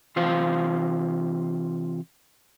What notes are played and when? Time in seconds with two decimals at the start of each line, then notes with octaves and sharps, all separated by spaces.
0.16 C3 E3 F4 C5 F5